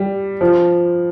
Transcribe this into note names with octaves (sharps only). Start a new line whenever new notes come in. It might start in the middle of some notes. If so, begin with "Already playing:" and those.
Already playing: G3
F3